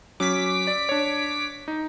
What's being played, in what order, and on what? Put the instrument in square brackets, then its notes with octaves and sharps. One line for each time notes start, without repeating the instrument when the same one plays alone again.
[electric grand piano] F#3 C#4 [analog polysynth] D6 B6
[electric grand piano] D5
D4 C#5
D#4